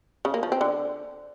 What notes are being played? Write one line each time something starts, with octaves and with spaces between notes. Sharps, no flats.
C#3
A#3
F3
C4
D3